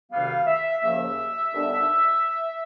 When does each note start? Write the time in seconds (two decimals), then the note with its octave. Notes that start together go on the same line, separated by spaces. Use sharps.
0.12 D2 C3 D#3 G3 B3 F5
0.47 E5
0.82 D#2 C#3 F3 A#3 E5
1.52 D#2 D3 G3 B3 D4